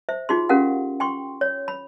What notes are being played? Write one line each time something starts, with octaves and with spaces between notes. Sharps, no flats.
C5 E5
D#4 F4 F#4 G#4 C6
C#4 G4 A#4 F5 F#5
G5 C6 C#6
C#5
B5